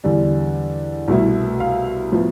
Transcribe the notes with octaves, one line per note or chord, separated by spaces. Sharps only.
E2 D3 G3 D4
C2 B2 A3 E4
F5
A2 F3 B3 E4